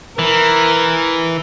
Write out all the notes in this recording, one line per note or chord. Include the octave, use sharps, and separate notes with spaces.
E3 A#4